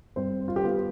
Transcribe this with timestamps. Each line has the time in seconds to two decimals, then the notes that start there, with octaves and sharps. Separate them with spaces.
0.16 G2 C4 C5
0.48 F4
0.56 G4
0.64 B3 F4